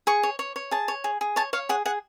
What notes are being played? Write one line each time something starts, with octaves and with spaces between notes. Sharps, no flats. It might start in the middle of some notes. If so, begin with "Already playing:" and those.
G#4 C#6
C#5
C#5
C#5
G#4 A5
C#5
G#4
G#4
C#5 A5
C#5 F5
G#4 F#5
G#4 F#5